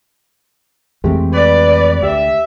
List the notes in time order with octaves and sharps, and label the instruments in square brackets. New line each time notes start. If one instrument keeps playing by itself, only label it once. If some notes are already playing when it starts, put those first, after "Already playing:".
[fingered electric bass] F2 E3 C4 [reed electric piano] G#3 A3 G4
[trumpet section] B4 [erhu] D5
[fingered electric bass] D2 [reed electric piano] G4 [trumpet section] E5